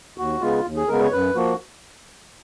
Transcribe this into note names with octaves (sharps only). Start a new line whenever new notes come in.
D#2 F#4
C#3 G#3 B3 F4
D#2
G#4
C#3 G#3 B3 A#4
C#5
F#2 B4
F3 A#3 F#4